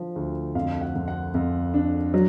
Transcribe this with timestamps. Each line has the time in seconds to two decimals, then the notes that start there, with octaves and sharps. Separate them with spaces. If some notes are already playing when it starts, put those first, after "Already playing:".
Already playing: D3 F3
0.16 D2
0.55 F2 F5
0.81 F#5
0.95 F2
1.08 F#5
1.34 F2
1.74 D4
2.14 F#3